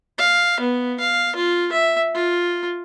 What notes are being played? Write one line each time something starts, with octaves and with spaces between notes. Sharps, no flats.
F5
B3
F5
F4
E5
F4